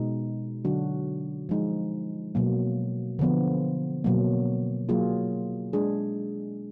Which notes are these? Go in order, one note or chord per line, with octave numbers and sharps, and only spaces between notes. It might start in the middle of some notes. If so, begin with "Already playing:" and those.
Already playing: B2 G#3 D#4
D3 F#3 D4 F#4
F3 G#3 D#4
B2 F#3 A#3
D3 F3 B3
B2 F#3 A#3
F#3 A#3 F4 G#4
G#3 D4 G#4